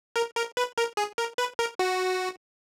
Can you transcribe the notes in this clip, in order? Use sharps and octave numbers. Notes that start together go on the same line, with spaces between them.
A#4
A#4
B4
A#4
G#4
A#4
B4
A#4
F#4